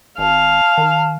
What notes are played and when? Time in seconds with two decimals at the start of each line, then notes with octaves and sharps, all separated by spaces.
0.18 G#1 F5 A5
0.78 D#3